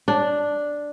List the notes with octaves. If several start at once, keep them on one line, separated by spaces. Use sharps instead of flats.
D4